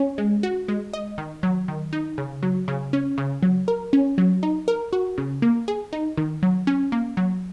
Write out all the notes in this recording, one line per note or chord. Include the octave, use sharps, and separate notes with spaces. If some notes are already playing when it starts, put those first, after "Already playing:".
Already playing: C#4
G#3
F#4
G#3
D#5
D#3
F#3
D#3
D#4
C#3
F#3
C#3
C#4
C#3
F#3
A#4
C#4
F#3
D#4
A#4
F#4
C#3
A#3
G#4
D#4
D#3
F#3
C#4
A#3
F#3